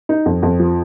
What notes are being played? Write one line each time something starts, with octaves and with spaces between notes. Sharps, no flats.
D#4
F2
F2
F3